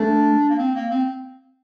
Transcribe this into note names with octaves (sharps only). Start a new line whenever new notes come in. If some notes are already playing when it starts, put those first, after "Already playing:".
Already playing: A3 D4
A#3
C4
A#3
C4